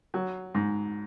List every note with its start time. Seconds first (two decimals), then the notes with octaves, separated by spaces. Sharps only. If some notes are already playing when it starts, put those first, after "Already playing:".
0.14 F#3
0.55 G#2